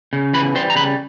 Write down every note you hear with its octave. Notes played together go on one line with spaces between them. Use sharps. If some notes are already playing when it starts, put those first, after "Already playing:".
C#3
E3 B4 B5
G3 C5 C6
A#5
C#3 B4 B5